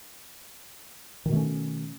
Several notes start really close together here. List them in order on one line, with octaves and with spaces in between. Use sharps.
D#3 B2 A3 C#4